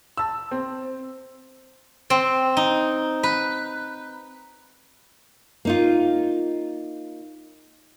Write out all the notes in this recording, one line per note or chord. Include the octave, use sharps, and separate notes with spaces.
A5 E6
C4
C4
D#4
B4
A#3 D#4 F4